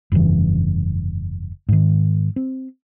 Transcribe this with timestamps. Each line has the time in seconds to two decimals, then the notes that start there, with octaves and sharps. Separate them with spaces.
0.12 F1 G2 C#3 E3
1.69 G#2 D#3
2.36 C4